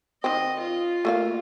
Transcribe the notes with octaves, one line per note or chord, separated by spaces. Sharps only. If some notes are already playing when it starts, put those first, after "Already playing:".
D#3 C4 D#5
F4
A3 A#3 F5